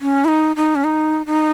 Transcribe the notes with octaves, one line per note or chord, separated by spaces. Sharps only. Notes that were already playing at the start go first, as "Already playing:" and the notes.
C#4
E4
D#4
D#4
C#4
D#4
D#4